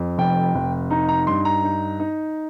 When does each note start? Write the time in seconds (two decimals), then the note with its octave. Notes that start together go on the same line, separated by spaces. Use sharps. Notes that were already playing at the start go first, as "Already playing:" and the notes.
Already playing: F2
0.18 F1 G5
0.55 F1
0.90 D#4 A#5
1.09 A#5
1.27 G2 C6
1.45 A#5
1.64 D#4
2.00 D#4